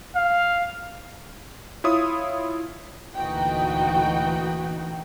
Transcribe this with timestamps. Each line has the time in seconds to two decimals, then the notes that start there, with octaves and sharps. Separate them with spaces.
0.15 F5
1.84 E4 F4 C#5 D#6
3.16 D2 A#2 E3 D#4 F#4 G5